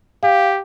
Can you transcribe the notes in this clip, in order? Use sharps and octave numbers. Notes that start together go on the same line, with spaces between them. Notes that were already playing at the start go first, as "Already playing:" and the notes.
G4 F5